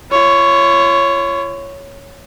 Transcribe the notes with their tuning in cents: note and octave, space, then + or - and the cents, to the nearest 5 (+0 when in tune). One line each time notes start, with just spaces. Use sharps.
F4 -45 C#5 +0